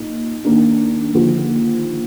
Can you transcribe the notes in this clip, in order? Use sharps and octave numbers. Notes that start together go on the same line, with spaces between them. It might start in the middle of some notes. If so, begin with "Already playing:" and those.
Already playing: A#2 A#3 D#4
D#2 D#3 A#3 D4
D#2 D3 F3